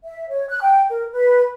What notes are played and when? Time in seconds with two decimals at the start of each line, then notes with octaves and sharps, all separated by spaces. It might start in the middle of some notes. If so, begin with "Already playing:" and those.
0.04 E5
0.29 C#5
0.49 F#6
0.62 G5
0.91 A#4
1.12 B4